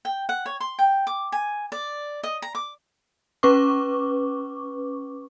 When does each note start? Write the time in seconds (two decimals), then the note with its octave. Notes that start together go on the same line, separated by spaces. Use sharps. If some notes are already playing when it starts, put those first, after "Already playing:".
0.05 G5
0.29 F#5
0.46 C#5
0.60 C6
0.79 G5
1.07 D6
1.32 G#5
1.72 D5
2.24 D#5
2.42 A#5
2.55 D6
3.43 C#4 B4 C#6 D6